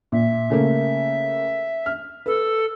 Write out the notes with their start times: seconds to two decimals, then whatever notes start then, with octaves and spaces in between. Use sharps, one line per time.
0.12 A#2 E5
0.50 C#3 A3 A#3
1.86 F6
2.26 A4 B4